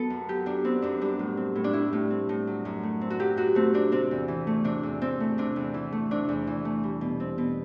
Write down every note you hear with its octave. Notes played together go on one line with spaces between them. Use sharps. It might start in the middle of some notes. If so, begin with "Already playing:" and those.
Already playing: F#3 B3 A4 B4
F#2
F#3 G4
F#2 D4
B3 C4
F#2 D4
G3 D4
A2
C4
A2
D4
G3 E4
A2
C4
A2
F#3
F#2
A3
C4
F#4
F#3 G4
F#2 F#4
A3 C4
C4 D4
C3 C4
E2
E3
A3
C3 D4
E2
E3 C4
A3
C3 D4
E2
E3
A3
C3 D4
E2
E3
A3
G3
B2
C4
B2